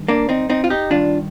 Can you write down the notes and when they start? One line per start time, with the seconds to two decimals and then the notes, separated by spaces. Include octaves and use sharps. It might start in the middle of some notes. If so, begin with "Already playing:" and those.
Already playing: G2 D#3
0.08 A#3 D4
0.29 C4 D#4
0.50 C4 D#4
0.64 F4
0.70 D#4 G4
0.90 G2 D#3 D4 F4